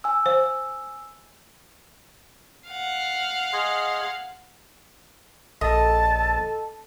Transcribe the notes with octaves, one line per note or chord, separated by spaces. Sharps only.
G#5 E6
C5
F5 F#5
G#4 D#5 C6
A#1 A4 D#5 A5